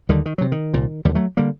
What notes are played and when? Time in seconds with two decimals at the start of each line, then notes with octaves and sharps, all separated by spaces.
0.09 D#2 D3 D#3 G3
0.26 D#3
0.38 D2 C3 F#3
0.52 D#3
0.73 C2 A#2
1.05 D#2 D3 D#3 G3
1.15 F#3 A3
1.37 D3 G3 A#3